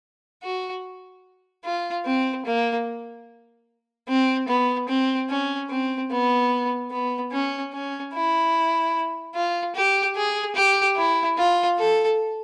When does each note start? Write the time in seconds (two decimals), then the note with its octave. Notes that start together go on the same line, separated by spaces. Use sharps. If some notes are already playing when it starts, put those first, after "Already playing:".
0.43 F#4
1.64 F4
2.06 C4
2.46 A#3
4.09 C4
4.48 B3
4.89 C4
5.29 C#4
5.70 C4
6.11 B3
6.91 B3
7.32 C#4
7.73 C#4
8.14 E4
9.35 F4
9.75 G4
10.16 G#4
10.56 G4
10.96 E4
11.37 F4
11.79 A4